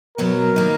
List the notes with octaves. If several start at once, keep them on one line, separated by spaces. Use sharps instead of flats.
B2 F#3 B3 A#4
D#3 A#3 D#4